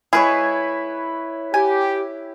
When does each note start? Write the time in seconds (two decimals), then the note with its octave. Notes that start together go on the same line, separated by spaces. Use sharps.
0.13 E4 G#4 B4 C#5
1.54 G4 G#5